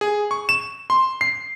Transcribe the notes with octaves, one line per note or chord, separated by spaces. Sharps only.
G#4
C#6
E7
C6
C7